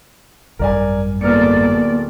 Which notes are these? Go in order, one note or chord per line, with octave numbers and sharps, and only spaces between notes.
G#1 F#2 G3 A#4 D5 G#5
D1 A#3 B3 A4 A#4 D5 F6 C#7